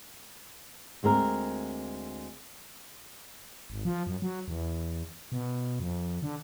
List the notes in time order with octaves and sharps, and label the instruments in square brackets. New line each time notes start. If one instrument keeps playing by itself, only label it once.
[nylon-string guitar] D2 G#3 C4 A#4
[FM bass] G#1
F3
F#2
F#3
E2
B2
F2
D3